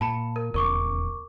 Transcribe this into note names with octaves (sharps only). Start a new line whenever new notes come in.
A#2 A5 B5 C#7
A#4
D#1 E2 C#3 A#4 C#6 D6